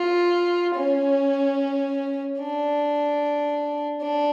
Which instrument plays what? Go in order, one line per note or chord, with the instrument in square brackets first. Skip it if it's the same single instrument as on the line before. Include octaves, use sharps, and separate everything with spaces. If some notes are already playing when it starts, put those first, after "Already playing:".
Already playing: [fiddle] F4
C#4
D4
D4